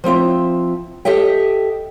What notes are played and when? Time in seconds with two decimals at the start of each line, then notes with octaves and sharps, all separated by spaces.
0.04 F3 C4 F4 E5
1.05 G4 A4 D#5 E5 G5